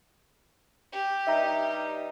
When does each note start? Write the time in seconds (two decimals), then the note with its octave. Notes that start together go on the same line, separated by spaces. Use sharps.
0.92 G4
1.27 G2 G3 D#4 E5 A#5